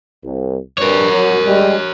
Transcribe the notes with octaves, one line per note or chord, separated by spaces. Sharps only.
C2
G2 A#4 C#5
F#3
G3 G#3